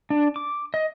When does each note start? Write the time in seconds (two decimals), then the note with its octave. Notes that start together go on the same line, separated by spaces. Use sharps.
0.10 D4
0.36 D6
0.74 D#5